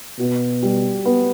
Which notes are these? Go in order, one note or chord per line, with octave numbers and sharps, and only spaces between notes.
B2 F#4
G3
B3